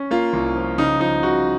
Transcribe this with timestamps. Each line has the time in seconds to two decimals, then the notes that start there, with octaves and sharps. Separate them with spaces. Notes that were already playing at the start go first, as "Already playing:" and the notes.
Already playing: C#4
0.11 A#3 F4
0.33 C2
0.55 F3
0.78 C#3 D#4
1.00 F3 D#4
1.22 C#3 F#4